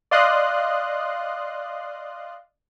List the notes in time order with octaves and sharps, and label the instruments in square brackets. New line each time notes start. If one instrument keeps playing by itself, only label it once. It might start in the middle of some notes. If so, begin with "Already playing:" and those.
[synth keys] D5 D#5 F5 C6 D#6 F#6